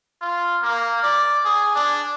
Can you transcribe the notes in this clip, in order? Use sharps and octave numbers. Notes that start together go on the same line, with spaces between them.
F4
A#3
D5
G#4
D4